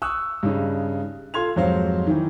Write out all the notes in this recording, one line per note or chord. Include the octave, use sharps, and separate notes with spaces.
C#6 D#6 E6 F#6
G2 C#3 D#4
F4 A4 C6 G#6 F7
F2 G#2 F#3 C5 F5
D#3 E3